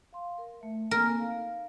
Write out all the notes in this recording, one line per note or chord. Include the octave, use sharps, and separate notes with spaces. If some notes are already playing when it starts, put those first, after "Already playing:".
F5 C6
A#4
A3 E5
A#3 C4 A#4 G#5
D#4 F5